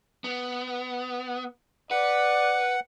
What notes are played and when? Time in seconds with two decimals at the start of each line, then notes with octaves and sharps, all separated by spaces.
0.24 B3
1.91 B4 D5 F#5